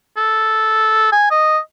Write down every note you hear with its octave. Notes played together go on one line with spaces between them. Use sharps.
A4
G#5
D#5